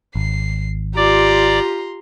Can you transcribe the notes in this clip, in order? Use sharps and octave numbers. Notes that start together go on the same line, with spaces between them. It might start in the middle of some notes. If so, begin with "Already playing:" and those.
G#1 C7
F4 G4 D5 A#5 C6